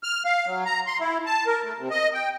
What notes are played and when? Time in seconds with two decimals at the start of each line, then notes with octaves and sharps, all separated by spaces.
0.03 F6
0.25 F5
0.46 F#3
0.66 A#5
0.87 C6
1.00 E4
1.26 A5
1.47 A#4
1.63 A3
1.78 C3
1.91 D#5
2.14 G5